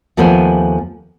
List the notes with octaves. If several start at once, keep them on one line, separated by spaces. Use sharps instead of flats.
D#2 F3 A3 B3 C5 G#5